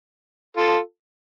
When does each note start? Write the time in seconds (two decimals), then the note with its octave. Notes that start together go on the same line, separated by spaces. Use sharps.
0.57 F4 A4